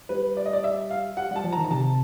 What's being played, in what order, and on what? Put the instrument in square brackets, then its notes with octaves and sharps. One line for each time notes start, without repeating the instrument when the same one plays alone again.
[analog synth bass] G3 [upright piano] B4
[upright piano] D5
D#5
D5
E5
F5
[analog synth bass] G3 [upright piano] F#5
[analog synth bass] G3 [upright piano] A5
[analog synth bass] F3
[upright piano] A#5
[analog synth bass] D#3
[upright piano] A#5
[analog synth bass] C3 [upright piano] A5